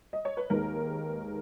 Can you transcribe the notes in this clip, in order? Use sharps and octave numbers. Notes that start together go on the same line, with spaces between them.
D#5
C#5
B4
D#2 D#3 G#3 A#4